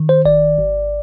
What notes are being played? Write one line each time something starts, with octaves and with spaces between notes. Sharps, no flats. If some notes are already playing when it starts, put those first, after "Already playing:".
Already playing: D#3
C5
G#1 D5
G#1